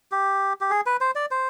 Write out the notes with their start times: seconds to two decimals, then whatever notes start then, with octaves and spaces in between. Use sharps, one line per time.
0.12 G4
0.61 G4
0.70 G#4
0.86 B4
1.01 C5
1.15 D5
1.31 C5